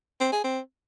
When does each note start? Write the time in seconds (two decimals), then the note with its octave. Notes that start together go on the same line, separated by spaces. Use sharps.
0.20 C4
0.32 G#4
0.44 C4